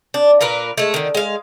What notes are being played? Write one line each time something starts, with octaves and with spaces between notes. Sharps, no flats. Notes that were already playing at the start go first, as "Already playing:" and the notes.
D4
A#2 A#4 B4
G#3 A3
D3 D#3
G#3 F5